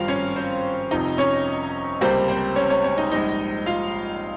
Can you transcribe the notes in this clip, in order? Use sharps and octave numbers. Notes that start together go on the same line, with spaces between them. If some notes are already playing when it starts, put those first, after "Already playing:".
Already playing: G#1 G2 F3 C4 F4 F5
C#4 C#5
C4 C5
F1 F2 C3 F3 D#4 D#5
C#4 C#5
C#2 C3 G3 A#3 C4 C5
C4 C5
C#4 C#5
C#4 C#5
C#4 C#5
D#4 D#5
A#1 G#2 G3 C4 D#4 D#5
F4 F5